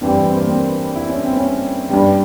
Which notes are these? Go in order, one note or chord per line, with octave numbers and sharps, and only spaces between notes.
G2 E3 G3 C4
C4
A#3
C4
E4
C#4
C4
C#4
G2 G3